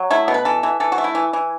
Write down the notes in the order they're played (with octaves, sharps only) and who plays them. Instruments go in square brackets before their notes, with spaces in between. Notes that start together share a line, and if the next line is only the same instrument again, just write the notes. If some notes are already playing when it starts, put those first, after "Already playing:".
Already playing: [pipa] F#3
A3 E4
B2
B4
E3 A4
E3
E3 A4
F#4
A3
E4
E3
E3